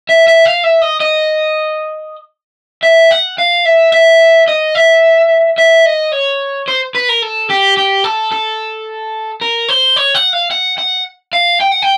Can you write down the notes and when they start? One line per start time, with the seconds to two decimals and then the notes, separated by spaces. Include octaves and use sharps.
0.09 E5
0.28 E5
0.45 F5
0.64 E5
0.82 D#5
1.00 D#5
2.83 E5
3.11 F#5
3.38 F5
3.65 E5
3.93 E5
4.48 D#5
4.75 E5
5.58 E5
5.85 D#5
6.12 C#5
6.68 C5
6.95 B4
7.09 A#4
7.22 A4
7.50 G4
7.77 G4
8.04 A4
8.32 A4
9.41 A#4
9.68 C5
9.96 C#5
10.15 F#5
10.33 F5
10.51 F#5
10.78 F#5
11.33 F5
11.61 G5
11.71 F#5
11.82 G5